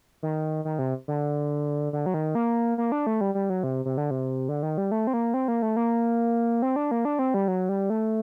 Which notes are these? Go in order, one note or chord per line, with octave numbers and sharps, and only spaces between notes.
D#3
D#3
C3
D3
D3
F#3
D#3
A#3
A#3
D4
A3
G3
G3
F#3
C3
C3
D3
C3
D3
D#3
G3
A3
C4
A#3
C4
A#3
A3
A#3
C4
D4
A#3
D4
C4
G3
F#3
G3
A3